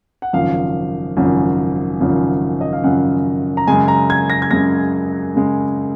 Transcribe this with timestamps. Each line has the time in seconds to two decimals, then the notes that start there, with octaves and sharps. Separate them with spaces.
0.22 F#5
0.33 G#1 F#2 C#3 F3 F5
1.17 G#1 F#2 C#3 F3
2.00 G#1 F#2 C#3 F3
2.61 D#5
2.73 F5
2.84 G#1 F#2 C#3 F3 F#5
3.57 A#5
3.67 F#2 C#3 G#3 G#5
3.88 A#5
4.10 G#6
4.30 A#6
4.42 G#6
4.51 F#2 C#3 G#3 A#6
5.35 F#2 C#3 G#3